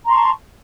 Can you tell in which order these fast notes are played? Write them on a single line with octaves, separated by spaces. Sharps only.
A#5 C6 C#6 A5